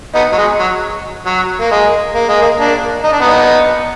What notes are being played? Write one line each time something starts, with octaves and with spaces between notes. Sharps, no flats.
B3 D#4
F#3
G#3
F#3
F#3
A#3
G#3
A#3
G#3
A#3
A#3 D4
D#4
D4
B3 D#4